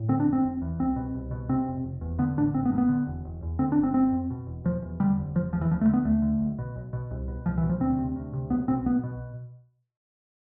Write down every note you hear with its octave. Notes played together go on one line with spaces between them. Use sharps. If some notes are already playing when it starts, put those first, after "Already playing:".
Already playing: A2
D3 C4
D4
F1
C4
F1
E2
C2 C4
B2
C2
B2
C3 C4
F1
F1
E2
D3 B3
A1 D4
A1 C4
B3
G2
B3
D3
E1
E1
E2
D3 C4
D4
G1
C4
G1 C4
F2
B2
E1
E1 F3
E2
D3 G3
F1
F1 F3
E2 F3
E3
D2 F3
A3
D3
B3
D2 A3
D3
B1
B2
B1
B2
C2
B2
C2 F3
E3
B2
F3
D2 C4
C3
D2
C3
B1 B3
B2 C4
B1 B3
B2